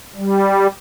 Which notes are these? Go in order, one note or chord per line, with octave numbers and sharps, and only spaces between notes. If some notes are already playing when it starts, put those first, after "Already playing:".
G3